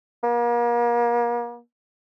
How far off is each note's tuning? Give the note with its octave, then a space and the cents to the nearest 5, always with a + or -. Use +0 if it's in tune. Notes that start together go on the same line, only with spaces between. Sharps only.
A#3 +35